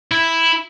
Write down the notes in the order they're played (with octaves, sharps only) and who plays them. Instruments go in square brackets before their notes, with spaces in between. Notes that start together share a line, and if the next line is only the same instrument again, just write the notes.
[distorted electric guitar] E4